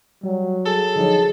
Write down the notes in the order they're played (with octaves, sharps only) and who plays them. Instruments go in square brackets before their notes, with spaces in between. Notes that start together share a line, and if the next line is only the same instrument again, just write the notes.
[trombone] F#3 [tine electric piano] G3
[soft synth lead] G#4 [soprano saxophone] A4 [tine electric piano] E6
[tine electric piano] D3 F3 F#3 [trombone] D#4